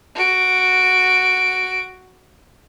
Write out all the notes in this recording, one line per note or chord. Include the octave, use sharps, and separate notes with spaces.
F#4 D7